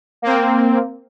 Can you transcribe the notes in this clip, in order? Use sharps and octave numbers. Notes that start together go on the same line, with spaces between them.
A#3 C4